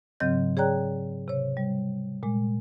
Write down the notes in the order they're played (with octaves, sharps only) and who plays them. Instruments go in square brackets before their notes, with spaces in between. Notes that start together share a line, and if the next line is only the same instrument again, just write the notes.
[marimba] G#2 C#3 F#3 C4 D#5 G6
G#4 C#5 D5 G5 A#5 F#6
C3 C#5
G3
A#2 G#3